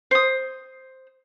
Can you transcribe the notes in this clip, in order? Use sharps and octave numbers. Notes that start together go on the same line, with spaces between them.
C5 D#6